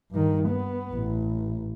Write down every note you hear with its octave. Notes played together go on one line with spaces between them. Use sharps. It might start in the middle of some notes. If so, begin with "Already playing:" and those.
G2 D#3
B3
A1